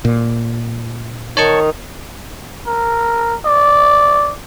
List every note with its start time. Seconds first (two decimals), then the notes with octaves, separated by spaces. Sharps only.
0.05 A#2
1.37 D#3 D#4 C#5 A5 C#6
2.67 A#4
3.46 D5